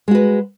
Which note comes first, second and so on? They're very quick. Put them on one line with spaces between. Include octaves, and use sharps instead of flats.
G#3 F#4 B4